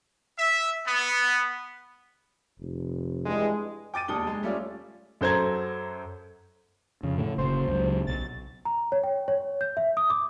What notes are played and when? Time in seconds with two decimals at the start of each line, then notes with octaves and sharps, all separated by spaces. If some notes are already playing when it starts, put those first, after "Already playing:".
0.39 E5
0.87 B3
2.59 F1
3.26 G2 E3 G#3
3.94 G5 D6 A6 D#7
4.08 E1 D#2 D4 D#6 G7
4.27 G#3
4.43 G3 A3 C#4 F4 D5
5.21 F#2 A4 C5 A#5 G#6
7.03 F2 C#3
7.18 A2 D3
7.38 F#1 C#3 C5
7.67 C#2 F#3
8.07 B1 A6
8.65 A#5
8.92 C#5
9.03 G5
9.28 C#5
9.61 G6
9.77 E5
9.97 D#6
10.10 D6